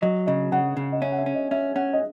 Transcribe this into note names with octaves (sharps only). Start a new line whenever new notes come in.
F#3 D#5
C#3 D#5
C#3 F#5
C#3
D#5
C#4 E5
F#5
E5
C#4
D#5
C#4 E5
C#4 F#5
D#5